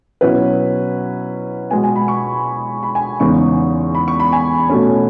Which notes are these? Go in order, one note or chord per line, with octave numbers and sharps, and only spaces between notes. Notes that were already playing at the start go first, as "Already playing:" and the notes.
B2 F#3 C#4 E4 B4
B2 G#3 B3 G#5
G#5
B5
C#6
B5
G#5
E2 C#3 G#3 B3 D#4 C#6
B5
C#6
B5
G#5
B2 A3 C#4